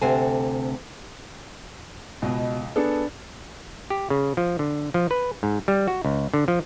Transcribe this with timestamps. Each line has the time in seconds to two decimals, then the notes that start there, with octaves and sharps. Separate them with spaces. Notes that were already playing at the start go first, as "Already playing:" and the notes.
0.01 D2 C3 A4 C5 G#5
2.22 C#2 B2 D#5
2.76 B3 D4 G#4 A4
3.90 G4
4.10 C#3
4.37 F3
4.59 D3
4.94 F3
5.11 B4
5.43 G#2
5.68 G3
5.88 F#4
6.05 C#2
6.34 D3
6.48 F3